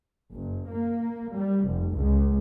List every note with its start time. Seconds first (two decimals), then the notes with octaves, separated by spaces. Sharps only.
0.33 F#1
0.72 A#3
1.35 G3
1.65 F1
1.97 C#2